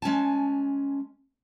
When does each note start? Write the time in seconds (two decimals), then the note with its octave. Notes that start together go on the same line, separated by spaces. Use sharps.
0.02 G#3 C#4 G#5 A5